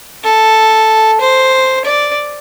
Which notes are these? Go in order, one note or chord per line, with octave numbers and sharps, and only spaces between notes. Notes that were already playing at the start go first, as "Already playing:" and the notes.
A4
C5
D5